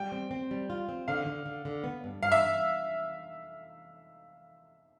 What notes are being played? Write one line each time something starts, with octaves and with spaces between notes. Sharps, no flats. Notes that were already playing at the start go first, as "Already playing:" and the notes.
Already playing: G3 G5
C4
C4
G3
F4
C4
D3 F5
D3
D3
D3
B3
G2
G2 F5
E5